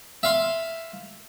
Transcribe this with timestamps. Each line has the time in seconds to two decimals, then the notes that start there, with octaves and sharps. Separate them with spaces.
0.23 E5 F5 C6